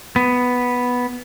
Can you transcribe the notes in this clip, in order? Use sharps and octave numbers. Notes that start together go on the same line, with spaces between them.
B3